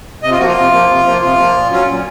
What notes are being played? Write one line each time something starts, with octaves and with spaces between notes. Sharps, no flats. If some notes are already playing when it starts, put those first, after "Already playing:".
C3 D#5
F4
F3 A#3 F#4
F4
C3
F3 A#3
C3
F3 A#3
C3 F4
F3 A#3
A#2
F#3 C#4 F4
A#2